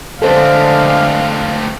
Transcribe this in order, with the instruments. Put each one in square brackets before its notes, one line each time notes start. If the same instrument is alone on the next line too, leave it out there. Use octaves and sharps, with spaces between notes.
[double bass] D3 G#3 [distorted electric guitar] A3 C4 [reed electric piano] A4 C5 [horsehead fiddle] F5